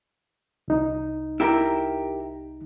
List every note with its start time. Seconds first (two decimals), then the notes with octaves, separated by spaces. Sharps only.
0.68 C2 D#4
1.40 E4 G4 A#4